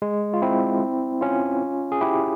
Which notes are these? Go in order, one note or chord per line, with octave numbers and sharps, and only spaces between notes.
G#3
F4
C4 E4
C#4 F4
G#4
E4 G4